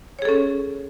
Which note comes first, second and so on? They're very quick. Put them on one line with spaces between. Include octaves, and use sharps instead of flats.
C#5 G#4 A4 C#4